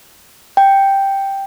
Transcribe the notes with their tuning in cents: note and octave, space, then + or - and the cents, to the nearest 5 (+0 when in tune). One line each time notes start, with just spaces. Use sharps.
G5 +0